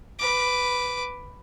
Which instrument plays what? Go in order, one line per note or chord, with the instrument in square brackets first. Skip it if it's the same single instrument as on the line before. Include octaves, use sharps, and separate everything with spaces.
[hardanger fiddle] B4 D6